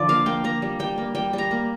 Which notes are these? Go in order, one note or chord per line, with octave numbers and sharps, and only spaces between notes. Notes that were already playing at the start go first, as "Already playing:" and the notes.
Already playing: D3 F3 D5
A#3 F5
A#3 G5
A#3 A#5
G3
G3 G5
A#3
G3 G5
G3 A#5
A#3